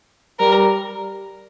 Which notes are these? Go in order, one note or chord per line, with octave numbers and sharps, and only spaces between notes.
G3 A#4